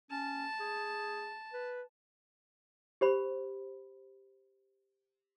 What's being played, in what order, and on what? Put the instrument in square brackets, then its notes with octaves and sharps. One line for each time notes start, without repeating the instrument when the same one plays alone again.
[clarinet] C#4 [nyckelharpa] A5
[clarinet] G#4
B4
[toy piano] G4 C5 B5